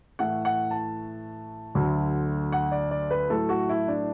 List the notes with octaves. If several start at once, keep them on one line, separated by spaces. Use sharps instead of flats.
A2 E3 A3 F#5
F#5
A5
D2 D3 F#3 A3
F#5
D5
D5
B4
A2 F#3 A3 A4
F#4
E4
D4